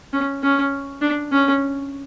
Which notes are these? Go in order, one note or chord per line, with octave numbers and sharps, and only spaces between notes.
C#4
C#4
D4
C#4